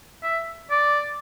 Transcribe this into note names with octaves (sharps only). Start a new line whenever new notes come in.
E5
D5